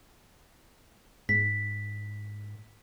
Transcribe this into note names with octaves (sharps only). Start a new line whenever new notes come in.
G#2 B6